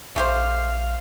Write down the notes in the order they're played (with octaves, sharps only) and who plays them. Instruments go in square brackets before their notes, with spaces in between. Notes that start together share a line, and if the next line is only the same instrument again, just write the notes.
[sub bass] A#1 [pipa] A3 G4 C5 [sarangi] F5